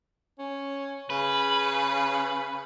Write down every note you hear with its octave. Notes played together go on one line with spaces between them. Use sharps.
C#4
C#3 B4